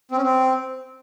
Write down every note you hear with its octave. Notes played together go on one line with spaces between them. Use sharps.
C4
C#4
C4